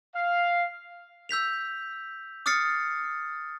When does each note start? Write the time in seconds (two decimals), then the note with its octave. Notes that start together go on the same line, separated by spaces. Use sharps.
0.15 F5
1.29 E6 G6 B6 F7
2.46 D6 D#6 F6 A6 C7 C#7